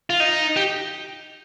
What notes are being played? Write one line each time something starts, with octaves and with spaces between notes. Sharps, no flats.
F4
D#4
G4